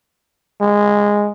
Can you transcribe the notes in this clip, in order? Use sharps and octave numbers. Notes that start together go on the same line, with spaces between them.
G#3